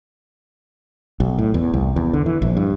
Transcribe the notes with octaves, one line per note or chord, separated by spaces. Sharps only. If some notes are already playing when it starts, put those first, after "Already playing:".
B1
A2
E2
C2
E2
D3
E3
A#1
G2